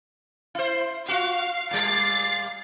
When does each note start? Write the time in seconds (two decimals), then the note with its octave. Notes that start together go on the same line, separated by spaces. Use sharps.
0.55 E4 C5
1.08 F4 F#4 F5
1.71 A#2 G3 A6 C7